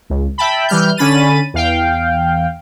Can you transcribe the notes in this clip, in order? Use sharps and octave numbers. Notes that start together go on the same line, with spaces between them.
C#2
E5 G5 A5 B5
E3 G3 F6 G6
D3 C#4 B5 A6 D#7
E2 F5 G5